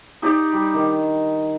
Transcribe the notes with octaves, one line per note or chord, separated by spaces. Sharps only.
D#4 G4 D5
G3
D#3